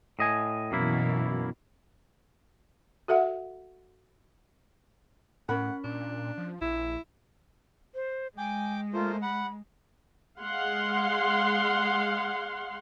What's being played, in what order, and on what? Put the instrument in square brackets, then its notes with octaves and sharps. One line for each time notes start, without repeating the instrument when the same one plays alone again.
[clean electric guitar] A2 D#5 G#5
[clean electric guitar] F#2 A#3 E4 [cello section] B2 E3
[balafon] F#4 A4 E5 F#5
[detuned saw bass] A2 [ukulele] C#4 A#4 B5 [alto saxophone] F#5
[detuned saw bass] A#2 [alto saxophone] D4
[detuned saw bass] F3
[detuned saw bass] A#1 [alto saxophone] E4
[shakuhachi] C5
[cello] G#3 [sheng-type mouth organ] G5 D6 [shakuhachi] G#5
[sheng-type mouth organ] A3 A#3 C5 [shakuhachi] F4
[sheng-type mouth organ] F#5 [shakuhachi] B5
[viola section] G#3 F5 F#5 C6